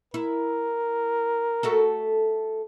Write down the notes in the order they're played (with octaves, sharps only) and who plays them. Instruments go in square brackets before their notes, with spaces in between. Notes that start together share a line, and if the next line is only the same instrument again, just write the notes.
[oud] E4 [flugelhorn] A#4
[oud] A3 F#4 A4